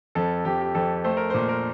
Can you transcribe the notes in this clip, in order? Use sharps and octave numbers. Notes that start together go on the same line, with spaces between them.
F2 A4
F2 G4
G4
F2 A4
A3 C5
A#4
A#2 C5
A#4